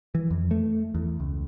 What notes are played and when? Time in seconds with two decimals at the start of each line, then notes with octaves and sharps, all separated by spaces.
0.15 E3
0.31 F2
0.51 A3
0.95 E2
1.20 C#2